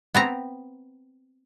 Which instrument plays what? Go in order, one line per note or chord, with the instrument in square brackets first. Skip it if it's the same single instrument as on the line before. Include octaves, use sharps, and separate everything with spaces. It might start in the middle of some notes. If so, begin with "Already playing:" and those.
[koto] B3 C4 A#5